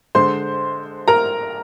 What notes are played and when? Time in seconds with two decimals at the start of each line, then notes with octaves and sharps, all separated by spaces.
0.15 D3 G#3 C5 C6
1.08 A#4 A#5